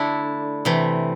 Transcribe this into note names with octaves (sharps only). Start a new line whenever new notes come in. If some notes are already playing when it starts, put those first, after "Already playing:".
Already playing: D3 A3 D4 E4
C3 E3 A3